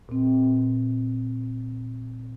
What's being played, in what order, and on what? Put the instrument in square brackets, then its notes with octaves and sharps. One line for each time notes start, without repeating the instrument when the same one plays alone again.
[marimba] A#2 C4